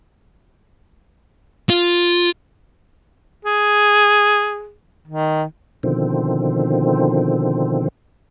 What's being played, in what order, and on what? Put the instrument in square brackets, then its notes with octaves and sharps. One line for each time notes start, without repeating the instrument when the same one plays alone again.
[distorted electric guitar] F4
[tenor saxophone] G#4
D#3
[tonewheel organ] B2 D3 D#3 F3 C4